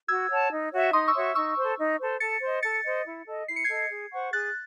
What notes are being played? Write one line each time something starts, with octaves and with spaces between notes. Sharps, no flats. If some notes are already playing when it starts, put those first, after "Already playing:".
F#4 E6 G#6
C#5 F#5 A5
D#4
F#4 C#5 E5
D#4 C6 D#6
C#6 E6
F#4 C#5 E5
D#4 C#6 E6
A4 C5
D#4
A4 C5
A4 A6 C#7
C5 D#5
A4 A6 C#7
C5 D#5
E4
A4 D#5
E4 C7
C#7
A4 D#5 G#6 C7
G#4
C5 F#5 C#6
G#4 F#6 A6